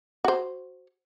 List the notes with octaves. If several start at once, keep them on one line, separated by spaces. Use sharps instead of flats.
F#4 C5